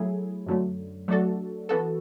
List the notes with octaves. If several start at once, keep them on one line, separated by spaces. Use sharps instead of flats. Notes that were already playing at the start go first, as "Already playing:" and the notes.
Already playing: F#3 A3 E4 G#4
F#2 D3 F#3 A3
F#3 A3 D4 F#4 A4
E3 B3 F#4 A4